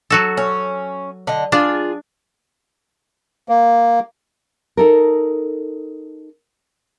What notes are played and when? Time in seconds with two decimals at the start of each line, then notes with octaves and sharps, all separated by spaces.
0.10 F#3 F#4 A4
0.37 C#4
1.27 D3 D#5
1.52 D4 F4 G#4
3.49 A#3
4.77 D#4 A4 A#4